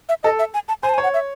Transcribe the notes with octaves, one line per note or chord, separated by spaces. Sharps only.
E5
A4 D#5
E5
G#5
A5
C5 G#5
A5
G#5
C#5
F#5
E5